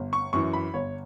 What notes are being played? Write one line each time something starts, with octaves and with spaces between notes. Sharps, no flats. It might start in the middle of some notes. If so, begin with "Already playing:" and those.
Already playing: G1
C#6
F#2 E3 C#6
B5
G1 C#5